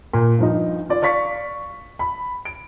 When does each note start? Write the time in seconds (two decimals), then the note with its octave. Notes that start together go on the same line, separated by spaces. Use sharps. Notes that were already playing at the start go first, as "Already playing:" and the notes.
0.13 A#2
0.38 G2 F3 D#4
0.89 F4 D5
1.02 D5 F5 C#6 B6
1.99 B5
2.45 D7